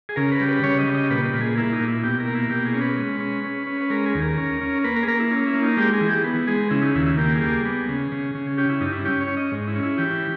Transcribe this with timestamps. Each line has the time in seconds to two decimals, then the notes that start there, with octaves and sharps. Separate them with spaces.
0.09 G#4
0.16 C#3 A#4
0.32 B4
0.40 G3
0.48 B4
0.63 C#3 C#5
0.78 D#5
0.86 G3
0.94 D#5
1.10 A#2 B4
1.25 B4
1.34 A#2
1.41 G#4
1.58 A#3 E4
1.73 D#4
1.80 A#2
1.88 E4
2.03 B2 G4
2.20 A#4
2.28 A#3
2.35 E4
2.50 B2 G4
2.66 G#4
2.74 C#4
2.81 B4
2.97 G#3
3.20 C#4
3.44 C#4
3.67 C#4
3.81 B4
3.90 G#3 A#4
4.06 G#4
4.15 D#2
4.22 A#4
4.38 C#4
4.61 C#4
4.84 A#3 B4
4.96 A#4
5.03 G#4
5.08 A#3 A#4
5.20 E4
5.32 C#4
5.47 E4
5.54 A#3
5.63 D#4
5.77 G#3 G4
5.94 G#4
6.01 E3
6.08 G4
6.24 B3
6.47 G#3 G#4
6.71 C#3 E4
6.82 D#4
6.95 D#2 E4
7.06 E4
7.18 A#3 G4
7.34 G#4
7.41 G3
7.48 G#4
7.65 B3
7.89 C#3
8.12 C#3
8.35 C#3
8.58 C#4 G4
8.69 E4
8.81 G2 D#4
8.93 E4
9.05 C#4 G4
9.21 C#5
9.28 C#4
9.37 D#5
9.52 G#2
9.68 E4
9.76 C#4
9.83 E4
9.98 E3 G4